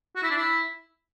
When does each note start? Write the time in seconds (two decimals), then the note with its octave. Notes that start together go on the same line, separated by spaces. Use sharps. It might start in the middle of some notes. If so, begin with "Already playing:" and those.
0.16 F#4
0.23 E4
0.31 D4
0.38 E4